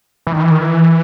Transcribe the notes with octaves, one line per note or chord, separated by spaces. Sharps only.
E3
D#3
E3
D#3
E3